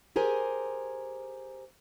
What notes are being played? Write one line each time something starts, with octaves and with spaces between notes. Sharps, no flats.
G4 G#4 A#4 C5 G#5